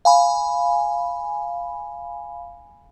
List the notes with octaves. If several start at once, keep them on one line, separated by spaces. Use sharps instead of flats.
F5 G#5 B5